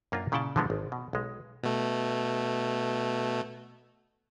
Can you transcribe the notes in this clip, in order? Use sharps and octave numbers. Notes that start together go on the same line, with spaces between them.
F#2 A#3 D4 F4
A#2 C#3 E4 F#5 G5 A5
D3 E3 F3 G#3 B3 D4
G#1
B2
B1 G#3
B2 A3